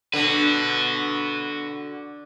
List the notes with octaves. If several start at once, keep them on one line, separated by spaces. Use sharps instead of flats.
D3 F#4 B4